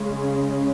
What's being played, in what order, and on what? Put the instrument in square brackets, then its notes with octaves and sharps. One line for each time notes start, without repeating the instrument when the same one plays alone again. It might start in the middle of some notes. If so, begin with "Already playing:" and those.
Already playing: [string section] C#3 G#3